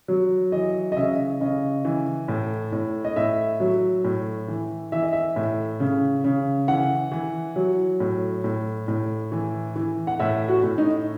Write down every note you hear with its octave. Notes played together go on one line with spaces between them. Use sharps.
F#3
E3 D#5
D#5
C#3 E5
C#3 D#5
E3
A2
A2
D#5
A2 E5
F#3
A2
E3
E3 E5
D#5
E5
A2
C#3
C#3
E3 F#5
E3
F#3
A2
A2
A2
E3
E3
F#5
A2 E5
F#4
A2
D#4